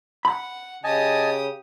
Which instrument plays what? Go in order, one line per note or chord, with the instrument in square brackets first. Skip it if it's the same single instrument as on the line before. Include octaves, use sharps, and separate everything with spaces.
[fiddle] F#5 [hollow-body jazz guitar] B5
[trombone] C#3 [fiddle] G4 D#6 [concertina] D#5 G#5 A5